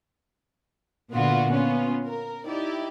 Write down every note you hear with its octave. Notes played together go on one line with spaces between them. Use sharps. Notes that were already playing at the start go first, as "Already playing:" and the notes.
A#2 D3 B3 F4 F#4
B3 C#4 F4
A#4
D#4 E4 G4 D5